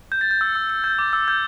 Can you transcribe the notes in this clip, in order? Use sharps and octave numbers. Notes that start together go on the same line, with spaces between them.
G6
A6
G6
E6
E6
E6
G6
D6
E6
G6